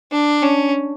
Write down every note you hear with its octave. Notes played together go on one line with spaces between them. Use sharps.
D4
C#4